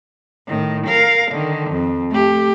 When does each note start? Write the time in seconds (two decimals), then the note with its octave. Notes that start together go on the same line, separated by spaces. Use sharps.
0.48 A2 D#3
0.87 A#4 F5
1.31 D3 D#3
1.71 F2
2.11 A3 G4